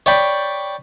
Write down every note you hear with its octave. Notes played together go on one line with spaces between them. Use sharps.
C#5 D5 G5 B5